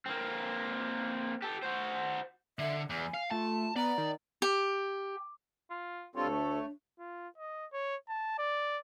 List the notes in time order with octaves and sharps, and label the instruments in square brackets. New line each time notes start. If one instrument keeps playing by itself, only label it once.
[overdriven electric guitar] A#3 C4
G4 A4
F#4 C5
[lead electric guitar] D3 [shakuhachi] E5
[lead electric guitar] E2 [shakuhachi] G#5
[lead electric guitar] F5
[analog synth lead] A3 [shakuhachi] F4 [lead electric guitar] A5
[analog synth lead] B3 [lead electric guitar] D5 [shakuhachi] A#5
[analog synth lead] D#3
[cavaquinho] G4
[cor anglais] F4
[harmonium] D2 A4 [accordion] G3 C4 F4 [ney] D4 [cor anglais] C#5
[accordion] A3
[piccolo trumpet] F4
D#5
C#5
A5
D5